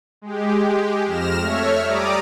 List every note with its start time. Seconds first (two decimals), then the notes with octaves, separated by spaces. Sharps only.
0.22 G#3 G4
1.06 F2 F6 A#6 E7
1.40 A3 C#5 E5 F6
1.84 G3 D5 A#5 D6 D#6